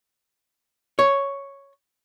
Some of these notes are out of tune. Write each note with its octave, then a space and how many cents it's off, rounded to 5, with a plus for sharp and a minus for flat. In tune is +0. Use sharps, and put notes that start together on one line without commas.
C#5 +0